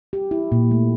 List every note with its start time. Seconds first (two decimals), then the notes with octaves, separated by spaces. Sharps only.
0.13 G4
0.31 E4
0.52 A#2
0.71 A3